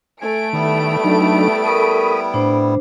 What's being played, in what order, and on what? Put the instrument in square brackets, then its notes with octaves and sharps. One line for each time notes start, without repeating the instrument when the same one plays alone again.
[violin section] A3 D7 [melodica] G#5
[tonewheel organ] D#3 [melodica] G3 B3 E4
[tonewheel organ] F#3 D4 D#4
[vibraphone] A4 A#4 C#6 [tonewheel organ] B5 D#6
[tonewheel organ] A2 [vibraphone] D4 C5